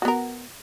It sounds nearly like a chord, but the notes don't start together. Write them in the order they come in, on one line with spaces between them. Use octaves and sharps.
F#4 B3 A#4